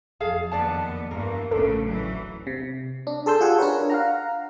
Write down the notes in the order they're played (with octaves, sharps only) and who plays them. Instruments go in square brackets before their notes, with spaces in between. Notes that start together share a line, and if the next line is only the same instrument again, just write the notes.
[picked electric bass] F#1 F2 [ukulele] G#4 A4 F5
[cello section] D#2 B3 [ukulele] D4 D5 A5
[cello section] G2 E3 A#3 [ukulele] A#4
[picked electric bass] D#1 A1 [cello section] C#3 A3 [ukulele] D4 [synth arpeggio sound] A4
[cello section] E3 F#3
[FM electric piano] C3
D4
G#4 A4 A5 C6 E6 G6
F4 G4 G#4 F#5 G#5
D4 A#4 B4 C#5
F5 F#5 A#5